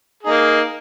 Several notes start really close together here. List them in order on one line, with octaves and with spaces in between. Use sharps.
G#4 D#4 A#3